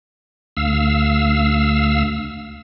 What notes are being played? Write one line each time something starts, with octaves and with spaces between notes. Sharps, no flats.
D2 F5 E6